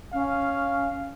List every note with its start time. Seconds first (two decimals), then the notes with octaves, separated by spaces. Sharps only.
0.13 C#4 F5